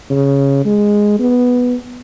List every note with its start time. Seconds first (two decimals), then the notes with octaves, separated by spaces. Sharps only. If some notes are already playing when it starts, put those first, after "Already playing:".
0.10 C#3
0.65 G#3
1.19 B3